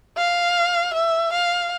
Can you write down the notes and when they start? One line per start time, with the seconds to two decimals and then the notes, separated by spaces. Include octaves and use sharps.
0.17 F5
0.93 E5
1.32 F5